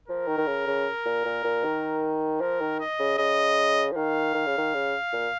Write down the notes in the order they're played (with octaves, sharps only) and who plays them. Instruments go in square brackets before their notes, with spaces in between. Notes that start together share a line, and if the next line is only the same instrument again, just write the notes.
[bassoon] F3 [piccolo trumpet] A#4
[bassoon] D#3
D#3
C#3
C#3
A#2
A#2
A#2
D#3
[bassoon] F3 [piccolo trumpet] A#4
[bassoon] D#3
[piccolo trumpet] D#5
[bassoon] C#3
[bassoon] C#3 [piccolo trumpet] D#5
[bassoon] F3
[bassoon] D#3 [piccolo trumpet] F5
[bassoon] D#3
C#3
D#3
C#3
A#2